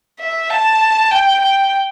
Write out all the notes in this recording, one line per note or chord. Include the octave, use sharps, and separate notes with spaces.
E5
A5
G5
G5